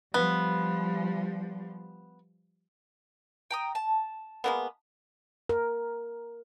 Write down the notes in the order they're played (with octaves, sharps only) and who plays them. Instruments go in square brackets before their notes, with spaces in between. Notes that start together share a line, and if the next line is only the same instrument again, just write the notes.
[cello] F3 G3 [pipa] B3
[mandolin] G5 A#5 D#6
A5
[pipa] G#3 A#3 B3
[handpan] A#4